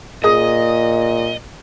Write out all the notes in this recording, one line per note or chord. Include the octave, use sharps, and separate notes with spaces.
A#2 G#4 D#5 D#6